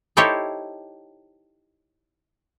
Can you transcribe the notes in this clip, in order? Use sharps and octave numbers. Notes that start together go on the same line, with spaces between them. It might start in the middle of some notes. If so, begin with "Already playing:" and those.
D#4 E4 G4 A4 C5 C#5